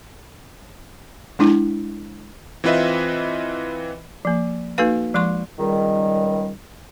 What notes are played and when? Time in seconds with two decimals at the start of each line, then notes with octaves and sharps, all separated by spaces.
1.39 G#3 D4 E4
2.64 E3 C4 F4 B4 D#5 E5
4.25 F3 A#3
4.78 A#3 D#4 F#4 A4 B4 F5
5.14 F3 G#3 C6 C#6
5.58 C#2 D#3 G3